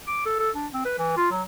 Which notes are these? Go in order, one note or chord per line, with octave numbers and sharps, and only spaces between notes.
D6
A4
A4
D4
C4
B4
E3
F4
F#3